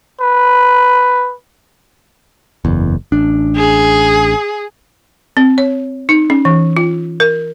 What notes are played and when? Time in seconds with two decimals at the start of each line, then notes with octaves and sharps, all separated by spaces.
0.21 B4
2.65 F#1 E2
3.12 A1 D4
3.56 G#4
5.37 C4
5.58 C#5
6.09 D#4
6.30 C#4
6.45 E3
6.77 F4
7.20 A#4